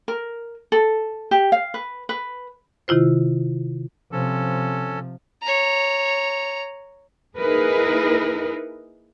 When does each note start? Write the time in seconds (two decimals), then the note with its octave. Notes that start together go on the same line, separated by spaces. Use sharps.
0.08 A#4
0.72 A4
1.31 G4
1.52 F5
1.74 B4
2.09 B4
2.88 C3 D#3 E4 F4 C5
4.12 C3 F3 C#4 A4
5.42 C#5 A#5
7.38 A#3 D#4 E4 G#4 A#4 B4